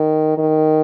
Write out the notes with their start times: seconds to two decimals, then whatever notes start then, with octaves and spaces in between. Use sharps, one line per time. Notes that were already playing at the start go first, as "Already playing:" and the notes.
Already playing: D#3
0.37 D#3